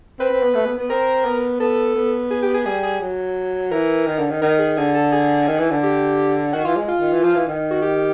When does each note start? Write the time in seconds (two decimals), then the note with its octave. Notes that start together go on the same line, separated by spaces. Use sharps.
0.19 C4 B4
0.31 C4
0.43 B3
0.55 A3
0.66 B3
0.78 B3
0.90 C4 A#4
1.25 B3
1.60 B3 A4
1.95 B3
2.31 G#4
2.42 G4
2.54 G#4
2.66 G3 G#4
2.83 G#4
3.01 F#3
3.71 E3 A#4
4.06 D#3
4.18 D3
4.30 D#3
4.42 D#3 A#4
4.59 G#4
4.77 D3 G#4
4.95 A4
5.12 G#4
5.48 D#3
5.59 E3
5.71 D3
5.83 G4
6.53 D#3 F#4
6.65 E3 F4
6.76 G#3
6.88 F4
7.00 D#3
7.12 E3
7.23 F3
7.35 E3
7.48 D#3
7.71 F#4
7.82 G4